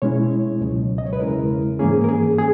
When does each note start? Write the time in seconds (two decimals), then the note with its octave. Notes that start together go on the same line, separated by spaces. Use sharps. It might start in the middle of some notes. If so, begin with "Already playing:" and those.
0.02 B2 G#3 C#4 E4 C#5
0.61 C#2 B2 F#3
0.98 D#5
1.06 C#5
1.13 B4
1.20 E2 C#3 G#3 C#4 E4 A#4
1.79 G#2 E3 A#3 C#4 G#4
2.04 A#4
2.09 G#4
2.38 G#4